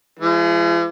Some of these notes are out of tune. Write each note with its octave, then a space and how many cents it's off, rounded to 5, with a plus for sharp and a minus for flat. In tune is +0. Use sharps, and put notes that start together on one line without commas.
F3 -45 G#3 +0